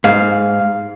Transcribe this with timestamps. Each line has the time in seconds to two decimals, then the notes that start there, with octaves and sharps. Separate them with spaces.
0.04 G#2 F5